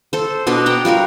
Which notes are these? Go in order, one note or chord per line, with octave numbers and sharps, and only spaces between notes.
A4 C5
B2 B3 D4 D#5
F#5 G5 A#5
G3 F4 F#4 A#4